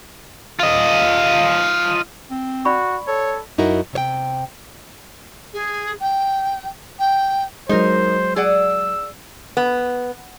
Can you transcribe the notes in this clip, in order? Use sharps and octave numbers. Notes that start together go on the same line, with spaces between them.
F4 D#5
C4
F#4 D5 B5 C#6
A4 C#5
F#2 D#4 E4 F#4 A#4
C3 C#5 G5
G#4
G5
G5
F#3 G#3 D#4 A#4 C5
G#4 D5 F#5 E6
B3